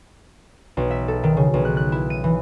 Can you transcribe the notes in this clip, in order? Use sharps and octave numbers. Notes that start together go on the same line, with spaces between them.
B1
E5
A4
D#3
C#3
B1
F#6
F#6
E4
D#7
E3